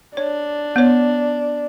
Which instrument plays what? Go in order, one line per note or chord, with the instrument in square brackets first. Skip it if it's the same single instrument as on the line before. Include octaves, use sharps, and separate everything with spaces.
[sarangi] D4 [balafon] C#5
[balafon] B3 C#5